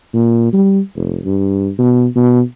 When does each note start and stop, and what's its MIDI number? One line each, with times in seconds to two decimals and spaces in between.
0.14 0.48 46
0.53 0.80 55
0.96 1.19 29
1.25 1.70 43
1.78 2.06 47
2.16 2.40 47